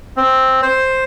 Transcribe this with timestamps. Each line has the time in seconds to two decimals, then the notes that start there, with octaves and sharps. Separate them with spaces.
0.17 C4
0.62 C5